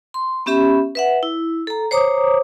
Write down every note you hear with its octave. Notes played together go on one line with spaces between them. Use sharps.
C6
B3 C#4 G4 E5 B5
B4 E5 F#5
E4
A4 A#5
C5 C#5 A#5 D6 D#6